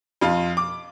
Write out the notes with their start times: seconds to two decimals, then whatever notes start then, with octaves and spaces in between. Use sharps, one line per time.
0.21 F2 F4
0.57 D6